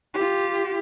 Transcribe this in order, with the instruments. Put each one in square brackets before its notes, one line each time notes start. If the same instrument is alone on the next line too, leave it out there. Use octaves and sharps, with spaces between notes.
[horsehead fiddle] F4 G4